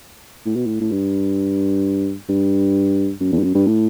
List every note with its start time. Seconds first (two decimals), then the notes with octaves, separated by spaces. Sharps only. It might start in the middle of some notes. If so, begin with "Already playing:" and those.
0.46 A2
0.56 B2
0.67 A2
0.81 A2
0.91 G2
2.29 G2
3.20 F#2
3.32 E2
3.39 G2
3.44 F#2
3.55 G2
3.67 A2